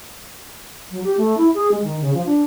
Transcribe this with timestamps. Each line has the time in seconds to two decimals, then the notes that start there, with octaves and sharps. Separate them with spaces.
0.90 F#3
1.04 G4
1.17 A3
1.37 E4
1.54 G#4
1.71 G#3
1.83 D#3
2.01 C#3
2.13 F3
2.25 D4